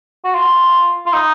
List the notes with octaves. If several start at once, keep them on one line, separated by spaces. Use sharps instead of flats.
F#4
F4
F4
D#4